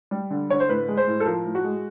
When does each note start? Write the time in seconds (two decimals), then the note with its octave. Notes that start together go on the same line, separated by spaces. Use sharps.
0.11 G3
0.31 D3
0.50 D3 C#5
0.60 C5
0.69 A2 B4
0.88 G#3
0.97 C5
1.07 A2
1.20 A4
1.26 F3 A#4
1.45 A2
1.55 F#4
1.64 G#3